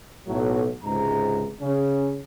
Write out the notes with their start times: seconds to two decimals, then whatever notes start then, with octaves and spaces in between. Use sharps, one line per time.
0.28 B1 A2 F#3
0.84 C#2 G#2 C3 A#5
1.61 C#3 C#4